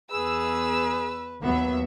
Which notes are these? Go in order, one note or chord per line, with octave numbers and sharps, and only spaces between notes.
E2 G#4 B4 E6
D#2 F#3 B3 B4 E5